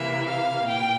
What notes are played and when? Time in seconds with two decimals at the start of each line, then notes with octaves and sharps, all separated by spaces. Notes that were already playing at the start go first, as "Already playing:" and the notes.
Already playing: C3 E3 A#3 E5
0.27 F5
0.67 A#2 G5